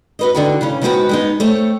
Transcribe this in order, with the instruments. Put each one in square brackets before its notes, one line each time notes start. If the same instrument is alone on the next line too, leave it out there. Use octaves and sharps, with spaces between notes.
[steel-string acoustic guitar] F#4 B4 D#5
D3 D#3 F#4
C#3 E3 C#4
D#3 G#3 B3 C4 F#4 B4
G#3 B3 D#4
A3 C4 C#5